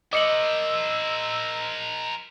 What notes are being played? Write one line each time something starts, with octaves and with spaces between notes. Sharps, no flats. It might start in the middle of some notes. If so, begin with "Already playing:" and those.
A#4 C5 D#5 D6 E6 C#7 F#7